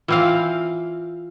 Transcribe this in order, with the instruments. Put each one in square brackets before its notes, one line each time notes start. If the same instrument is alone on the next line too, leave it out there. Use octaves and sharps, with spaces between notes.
[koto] E3 C4 F5 [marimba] F4